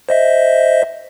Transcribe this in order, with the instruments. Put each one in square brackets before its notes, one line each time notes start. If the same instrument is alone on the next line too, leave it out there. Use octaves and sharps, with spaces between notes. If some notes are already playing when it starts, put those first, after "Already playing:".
[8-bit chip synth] C5 D#5 E5